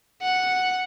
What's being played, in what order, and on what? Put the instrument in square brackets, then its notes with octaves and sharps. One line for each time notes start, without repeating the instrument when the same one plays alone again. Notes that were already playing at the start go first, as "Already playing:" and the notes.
[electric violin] F#5